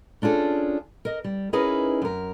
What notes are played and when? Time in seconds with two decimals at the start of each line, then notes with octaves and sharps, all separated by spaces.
0.22 C#4 D4 F4 G#4 A4
1.05 A#4 D#5
1.24 G3
1.53 C#4 D#4 E4 G#4 A#4 B4
2.02 F#2 A#4